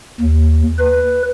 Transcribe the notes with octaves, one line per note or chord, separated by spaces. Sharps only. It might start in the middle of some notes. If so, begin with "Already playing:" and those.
D#2
B4